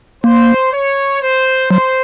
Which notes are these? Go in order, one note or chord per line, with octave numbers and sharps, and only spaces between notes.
A#3 C5
C#5
C5
F#3 C5